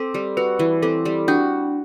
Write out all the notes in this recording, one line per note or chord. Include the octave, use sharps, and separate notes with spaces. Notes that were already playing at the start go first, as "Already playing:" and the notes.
Already playing: C4 A4
G3
F#4 B4
E3
C4 A4
G3
D4 F#4